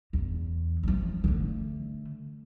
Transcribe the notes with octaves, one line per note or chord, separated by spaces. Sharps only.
E2
F3 G3
D3 A3